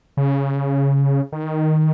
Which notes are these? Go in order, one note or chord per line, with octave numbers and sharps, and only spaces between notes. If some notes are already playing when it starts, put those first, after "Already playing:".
C#3
D#3